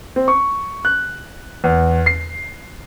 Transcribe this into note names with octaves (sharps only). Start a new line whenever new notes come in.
C4
C#6
F#6
E2
C7